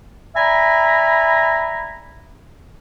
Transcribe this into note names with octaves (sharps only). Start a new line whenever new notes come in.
D5 E5 G#5 A#5 B5